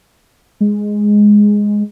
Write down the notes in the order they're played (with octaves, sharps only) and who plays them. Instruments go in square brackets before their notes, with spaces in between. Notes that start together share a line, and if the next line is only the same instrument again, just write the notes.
[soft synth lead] G#3